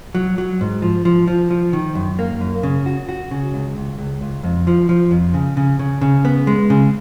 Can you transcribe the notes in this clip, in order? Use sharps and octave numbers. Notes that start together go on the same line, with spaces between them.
F#3
F#3
G#2
F3
F3
F3
F3
D#3
F#2
A#3
F#2
C#3
F#4
F#4
C#3
C#2
C#2
C#2
C#2
F2
F3
F3
F2
C#3
C#3
C#3
C#3
B3
G#3
C#3